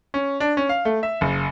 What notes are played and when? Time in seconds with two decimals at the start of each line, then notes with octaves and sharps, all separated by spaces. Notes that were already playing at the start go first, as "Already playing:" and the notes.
0.14 C#4
0.40 D4
0.57 C#4
0.69 F5
0.85 A3
1.03 E5
1.21 F#1